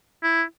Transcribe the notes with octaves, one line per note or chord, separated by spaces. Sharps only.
E4